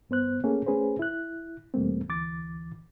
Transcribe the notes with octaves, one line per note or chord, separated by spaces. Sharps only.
G2 B3 C5 F#6
A3 A#3 C#4 G#4 A4
A3 C#4 G#4 B4 C5
E4 F#6
E2 B2 G3 A3 A#3 C4
D2 E3 D6 A6